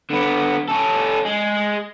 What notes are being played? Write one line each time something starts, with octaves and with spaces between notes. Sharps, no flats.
D3 B3
C#4 A4
G#3